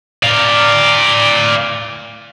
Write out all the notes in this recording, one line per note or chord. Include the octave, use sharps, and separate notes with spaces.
D5 F5